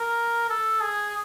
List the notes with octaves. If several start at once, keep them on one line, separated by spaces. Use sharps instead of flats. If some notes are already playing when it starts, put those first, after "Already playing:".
Already playing: A#4
A4
G#4